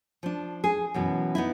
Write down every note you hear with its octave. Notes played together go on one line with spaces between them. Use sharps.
F3 D4
G#4
F#2 B2 E3
B3 D#4 E4